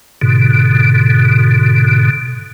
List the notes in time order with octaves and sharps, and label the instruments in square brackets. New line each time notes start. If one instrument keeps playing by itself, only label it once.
[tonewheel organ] G#2 B2 D3